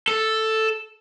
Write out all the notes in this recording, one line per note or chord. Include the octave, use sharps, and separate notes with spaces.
A4